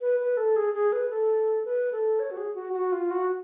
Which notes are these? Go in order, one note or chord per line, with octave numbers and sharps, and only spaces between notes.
B4
B4
A4
G#4
G#4
B4
A4
B4
A4
C#5
F#4
G#4
F#4
F#4
F4
F#4